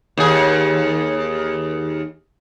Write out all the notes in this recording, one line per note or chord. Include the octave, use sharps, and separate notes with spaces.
D#2 G#4